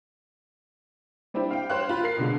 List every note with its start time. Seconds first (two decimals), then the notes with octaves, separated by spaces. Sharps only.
1.34 G3 C4 D4 E4 G4
1.51 F5 G5
1.70 C5 C#5 F5 F#6
1.89 F4 B5
2.03 A#4 C7
2.17 B2 D3 G#3